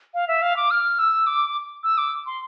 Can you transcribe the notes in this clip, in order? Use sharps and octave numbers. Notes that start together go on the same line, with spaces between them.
F5
E5
F5
D6
F6
E6
D6
E6
D6
C6